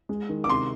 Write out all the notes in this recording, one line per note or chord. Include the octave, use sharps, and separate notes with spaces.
G#3
D#3
D6
C3 C6